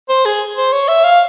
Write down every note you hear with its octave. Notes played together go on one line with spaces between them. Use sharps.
C5
G#4
C5
C#5
E5
F5